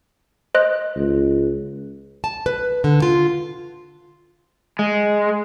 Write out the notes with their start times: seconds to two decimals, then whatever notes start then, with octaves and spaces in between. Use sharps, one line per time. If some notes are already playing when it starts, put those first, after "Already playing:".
0.55 C5 D#5 F#6
0.96 C#2
2.24 A5
2.46 B4
2.84 D3
3.02 F4
4.79 G#3